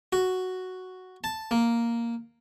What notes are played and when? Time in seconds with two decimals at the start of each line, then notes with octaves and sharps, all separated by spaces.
0.13 F#4
1.24 A5
1.51 A#3